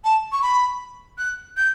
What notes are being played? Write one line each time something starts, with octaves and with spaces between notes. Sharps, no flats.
A5
C#6
B5
F#6
G6